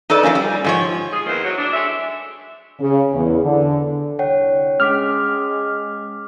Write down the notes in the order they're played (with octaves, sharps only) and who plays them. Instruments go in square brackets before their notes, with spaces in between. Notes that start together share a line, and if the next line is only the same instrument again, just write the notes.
[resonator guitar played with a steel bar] D#4 A4 B4 D5 D#5
F3 G3 A#3 C#4
G3
G#2 F3 C#5
[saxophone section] F4 G#4
E2 D#3 A#3 C5
F#3
D4
G#3 A3 E5
[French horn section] C#3
E2
D3
[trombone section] C2 D3 [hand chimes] C#5 F#5 G5
[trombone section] G#3 [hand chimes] C#4 D6 B6 [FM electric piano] F6